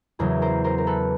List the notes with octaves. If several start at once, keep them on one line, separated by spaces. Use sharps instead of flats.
E2 C#3 F#3 G#4 A#4
A#4 C5
A#4 C5
A#4
A4 B4